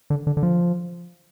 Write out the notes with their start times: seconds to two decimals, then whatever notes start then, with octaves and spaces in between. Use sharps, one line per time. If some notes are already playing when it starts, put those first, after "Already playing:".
0.10 D3
0.27 D3
0.37 D3
0.43 F3